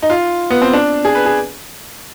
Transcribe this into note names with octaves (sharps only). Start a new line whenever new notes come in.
D#4
F4
B3
C4
D4
G#4
B4
G#4